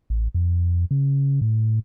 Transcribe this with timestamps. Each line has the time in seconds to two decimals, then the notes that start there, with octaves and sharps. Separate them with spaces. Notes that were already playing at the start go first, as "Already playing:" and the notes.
0.10 A1
0.34 F2
0.91 C#3
1.41 A2